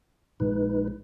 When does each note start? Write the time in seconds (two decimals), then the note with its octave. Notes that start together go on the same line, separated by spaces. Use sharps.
0.40 A#1 A#2 G#3 D#4 B4